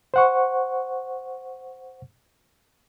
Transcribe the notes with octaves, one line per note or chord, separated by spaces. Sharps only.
C5 F#5 C#6